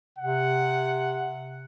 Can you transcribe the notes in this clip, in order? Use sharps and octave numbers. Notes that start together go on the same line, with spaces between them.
C3 F#5